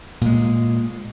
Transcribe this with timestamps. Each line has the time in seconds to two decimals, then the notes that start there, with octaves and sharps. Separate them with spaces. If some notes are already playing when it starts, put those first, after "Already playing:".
0.21 A#2 G#3